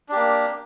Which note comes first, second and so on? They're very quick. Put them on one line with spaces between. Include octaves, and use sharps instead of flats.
D4 G4 A#3